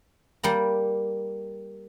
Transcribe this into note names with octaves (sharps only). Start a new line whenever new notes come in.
G3 A#3 A#5